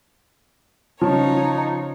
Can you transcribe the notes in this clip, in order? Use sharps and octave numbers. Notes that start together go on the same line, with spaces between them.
C#3 F3 C#4 D#4 C#5